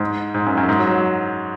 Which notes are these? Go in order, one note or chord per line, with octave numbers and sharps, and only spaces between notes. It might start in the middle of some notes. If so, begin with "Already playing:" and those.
Already playing: G#2
G#2
F#2
F#2
G#2
F#3
F#3